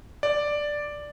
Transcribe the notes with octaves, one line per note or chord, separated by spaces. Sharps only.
D5